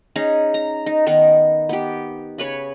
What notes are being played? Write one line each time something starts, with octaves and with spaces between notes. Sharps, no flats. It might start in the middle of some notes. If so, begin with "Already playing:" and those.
C#4 D#4 G#4
A#5
D#4
D#3 B3 D#4
B3 G4
C#3 B4 C#5